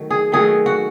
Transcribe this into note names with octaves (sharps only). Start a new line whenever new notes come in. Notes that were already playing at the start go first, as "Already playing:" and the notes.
Already playing: D#3 F#3 A3
G#4
D#3 F#3 A3 C#4 G#4
F#4